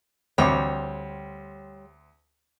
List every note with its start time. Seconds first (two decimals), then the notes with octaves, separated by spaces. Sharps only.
0.38 D2 G3 C4 C#5 D6